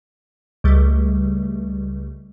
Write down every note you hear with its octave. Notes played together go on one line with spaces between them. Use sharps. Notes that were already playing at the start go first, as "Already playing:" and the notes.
C#2 G3 A3